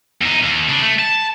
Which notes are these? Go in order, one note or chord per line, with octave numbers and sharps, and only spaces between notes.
E2 D#4
D#2
C#3 D4
A3
A5